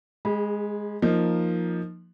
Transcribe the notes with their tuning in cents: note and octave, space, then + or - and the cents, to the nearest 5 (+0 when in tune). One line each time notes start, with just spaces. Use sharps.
G#3 +0 G#4 -40 B5 -20
F3 +0 A#3 +0 D#4 +0